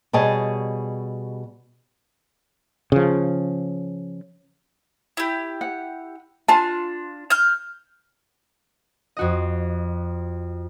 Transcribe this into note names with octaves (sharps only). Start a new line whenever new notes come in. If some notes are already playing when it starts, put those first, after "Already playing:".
B2 G3 G#4 C#5 D#5 A5
C#3 F3
E4 G4
F#5
D4 F4 A5
F6 G6
F2 F#4 D#5